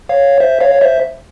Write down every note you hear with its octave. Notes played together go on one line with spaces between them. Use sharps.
C#5 F5
C5 E5
C#5 F5
C#5
C5 E5